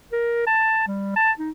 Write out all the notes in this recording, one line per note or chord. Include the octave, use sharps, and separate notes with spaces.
A#4
A5
G3
A5
D#4